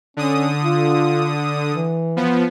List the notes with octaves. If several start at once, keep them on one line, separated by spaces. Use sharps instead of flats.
D3 C#4 D#6
F4
E3
F3 B3